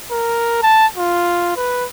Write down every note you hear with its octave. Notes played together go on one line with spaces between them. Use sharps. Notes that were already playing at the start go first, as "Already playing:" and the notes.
A#4
A5
F4
B4